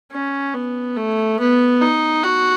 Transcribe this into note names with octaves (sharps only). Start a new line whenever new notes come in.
C#4
B3
A3
B3
D#4
F#4